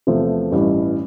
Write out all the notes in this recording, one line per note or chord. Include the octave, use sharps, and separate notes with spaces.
E2 C3 F3 A3
A1 G2 E3